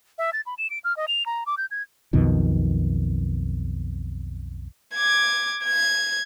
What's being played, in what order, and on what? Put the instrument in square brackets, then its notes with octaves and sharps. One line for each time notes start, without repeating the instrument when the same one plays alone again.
[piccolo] E5
A6
B5
E7
D7
F6
D#5
F7
A#5
D6
G6
G#6
[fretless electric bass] B1 F2 B2 D#3
[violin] D6 G#6
G#6